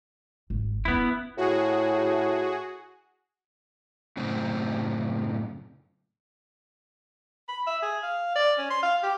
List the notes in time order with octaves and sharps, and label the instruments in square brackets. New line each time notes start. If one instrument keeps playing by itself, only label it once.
[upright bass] G#1
[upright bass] E2 C#4 [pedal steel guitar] B3 E4
[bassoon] A2 [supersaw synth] F#4 G#4
[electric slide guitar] F#2 A2 C#3 C4
[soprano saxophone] B5
E5
G#4
F5
D5
C#4
C6
F5
G4